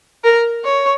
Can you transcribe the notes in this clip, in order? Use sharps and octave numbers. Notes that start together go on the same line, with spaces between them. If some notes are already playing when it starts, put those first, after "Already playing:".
A#4
C#5